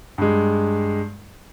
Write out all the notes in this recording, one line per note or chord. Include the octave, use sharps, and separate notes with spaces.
G2 G#3